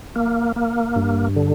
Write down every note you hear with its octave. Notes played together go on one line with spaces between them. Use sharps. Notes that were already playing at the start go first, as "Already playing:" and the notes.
A#3
A#3
G2
D3